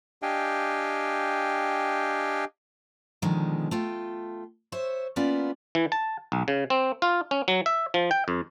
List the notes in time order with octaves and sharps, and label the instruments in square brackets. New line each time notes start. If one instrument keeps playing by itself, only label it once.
[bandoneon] D4 G4 D#5 F5 G5 G#5
[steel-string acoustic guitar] B2 D3 D#3 F3 G#3
A3 F4 G5
C5 C#5 E5
A#3 B3 C#4 E4 F4 D5
[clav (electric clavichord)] E3
A5
B1
C#3
C4
F4
C#4
F#3
E5
F3
G5
F2